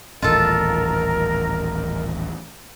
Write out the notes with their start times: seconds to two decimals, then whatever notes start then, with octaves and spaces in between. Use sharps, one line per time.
0.22 D#1 A1 F4 A4 A#4 D#5